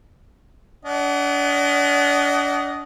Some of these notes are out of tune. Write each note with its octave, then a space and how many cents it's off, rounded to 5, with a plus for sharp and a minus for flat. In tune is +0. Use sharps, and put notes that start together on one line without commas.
D4 -35 D#5 +0 F#5 +20